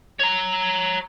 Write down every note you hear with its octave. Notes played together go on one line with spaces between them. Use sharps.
C#5 A#5